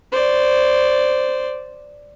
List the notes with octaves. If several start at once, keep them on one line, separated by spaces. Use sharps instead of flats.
C5 D5